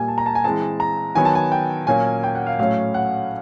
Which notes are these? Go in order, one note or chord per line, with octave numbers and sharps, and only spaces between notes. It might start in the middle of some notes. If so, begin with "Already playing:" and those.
Already playing: A#2 G3 A#3 G#5
A5
A#5
A5
G#5
E3 G#3 C4 A5
A#5
D#3 F#3 B3 G#5
A5
G#5
G5
A#2 F#3 A#3 C#4 G#5
G5
F#5
F5
A2 F#3 A3 C#4 F5
F#5